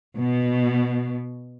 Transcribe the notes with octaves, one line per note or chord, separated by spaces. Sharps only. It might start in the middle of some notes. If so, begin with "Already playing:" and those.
B2